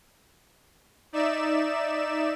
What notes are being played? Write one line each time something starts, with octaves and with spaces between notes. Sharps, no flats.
D#4 D5 E5 E7